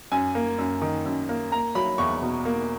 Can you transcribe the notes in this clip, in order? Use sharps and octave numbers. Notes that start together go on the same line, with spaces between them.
F#2 G#5
A#3
F#2
D#3
F#2
A#3
A#3 A#5
F#3 B5
E2 C#6
B2
A#3